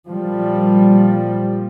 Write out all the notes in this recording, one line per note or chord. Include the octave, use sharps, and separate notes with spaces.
A#2 F3 G3